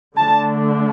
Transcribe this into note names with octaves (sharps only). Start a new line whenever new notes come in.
D3 A3 D4 A5